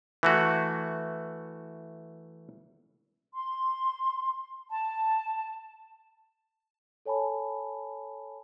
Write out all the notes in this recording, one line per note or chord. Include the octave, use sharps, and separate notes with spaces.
E3 A3 F#4
C6
A5
A4 C#5 G#5 A5 B5